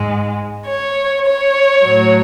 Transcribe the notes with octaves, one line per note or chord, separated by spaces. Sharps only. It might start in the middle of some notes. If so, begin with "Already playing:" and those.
Already playing: G#2 G#3
C#5
C#5
A2 F#3